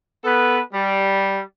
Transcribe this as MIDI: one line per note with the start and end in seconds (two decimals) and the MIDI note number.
0.24 0.60 59
0.24 0.60 69
0.24 0.60 71
0.73 1.40 55